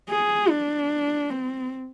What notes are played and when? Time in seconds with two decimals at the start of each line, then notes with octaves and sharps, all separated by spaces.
0.10 G#4
0.50 D4
1.30 C4